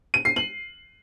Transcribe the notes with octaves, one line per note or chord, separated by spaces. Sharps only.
D#7
C7
F#7